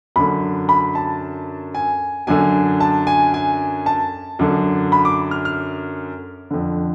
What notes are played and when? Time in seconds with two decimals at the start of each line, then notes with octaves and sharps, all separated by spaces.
0.16 F#2 D3 B5
0.69 B5
0.95 A5
1.75 G#5
2.27 F#2 D3 G#5
2.80 A5
3.07 G#5
3.34 G#5
3.86 A5
4.39 F#2 D3
4.92 B5
5.05 D6
5.31 F6
5.45 F6
6.51 F2 D3